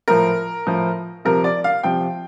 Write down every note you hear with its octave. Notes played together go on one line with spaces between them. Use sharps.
A2 F3 A#4
A2 F3
C3 F3 A#4
D5
F5
C3 F3 G5